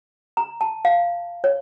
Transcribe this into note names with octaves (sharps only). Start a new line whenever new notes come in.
A#5
A5
F5
C#5